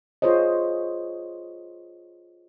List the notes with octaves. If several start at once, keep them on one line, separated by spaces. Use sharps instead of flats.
F4 G#4 C5 C#5 D#5